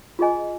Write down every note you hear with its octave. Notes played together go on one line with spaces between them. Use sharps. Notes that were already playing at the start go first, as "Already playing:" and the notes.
F4 G#4 D#5 G#5